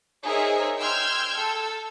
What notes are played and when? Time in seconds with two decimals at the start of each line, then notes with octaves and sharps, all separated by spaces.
0.24 D#4 G#4 A#4 C5 C#5 E5
0.79 G5 C6 E6 F6 G6 G#6
1.37 A4 E6